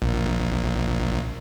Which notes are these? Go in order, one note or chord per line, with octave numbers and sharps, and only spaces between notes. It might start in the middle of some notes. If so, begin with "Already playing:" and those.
A#1